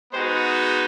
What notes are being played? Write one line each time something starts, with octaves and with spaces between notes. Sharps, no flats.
G#3 B3 D#4 F#4 C5